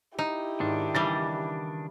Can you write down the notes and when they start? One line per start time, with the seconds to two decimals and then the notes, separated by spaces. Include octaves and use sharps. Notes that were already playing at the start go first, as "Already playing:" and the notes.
0.19 D#4 E4 G4
0.60 G#2 D#3 D4
0.95 C#3 E3 G3 A6